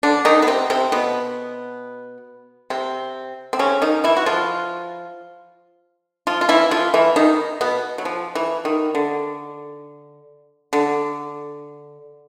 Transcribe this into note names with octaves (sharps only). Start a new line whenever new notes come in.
D3 D4
D#3 D#4
B3
C3 C4
C3 C4
B2 B3
C3 C4
C4
C#3 C#4
D#3 D#4
E3 E4
F#4
F3 F4
F3 F4
F4
E3 E4
F3 F4
E3 E4
D#3 D#4
B2 B3
F#3
F3
E3
D#3
D3
D3